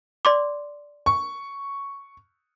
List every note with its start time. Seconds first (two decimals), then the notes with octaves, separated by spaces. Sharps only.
0.25 D5 C6 D6
1.06 C#6